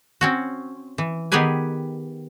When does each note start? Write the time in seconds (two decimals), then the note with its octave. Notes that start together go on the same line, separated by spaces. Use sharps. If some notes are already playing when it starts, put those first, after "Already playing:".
0.21 C4 C#4 F#4
0.98 E3
1.32 D#3 B3 G4 G#4 B4 G#5